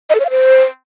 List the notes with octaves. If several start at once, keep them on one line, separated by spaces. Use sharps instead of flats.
D#5
A4
C#5
F5
C5